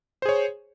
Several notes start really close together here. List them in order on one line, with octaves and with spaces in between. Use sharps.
C5 G#4 C#5